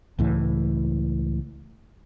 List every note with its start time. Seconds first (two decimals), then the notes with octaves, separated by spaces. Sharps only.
0.19 C#2 A2 E3